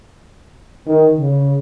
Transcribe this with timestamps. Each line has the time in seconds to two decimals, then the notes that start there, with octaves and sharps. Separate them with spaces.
0.87 D#3
1.18 C#3